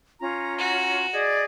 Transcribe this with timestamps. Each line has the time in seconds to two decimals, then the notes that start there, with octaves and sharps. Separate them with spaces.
0.21 C#4 F4 A#5
0.58 F#4
1.13 G#4 D5 D#5